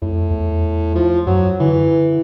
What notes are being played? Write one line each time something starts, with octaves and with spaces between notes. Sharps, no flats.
F2 A2
E2
F3
F#2 F#3
D3 E3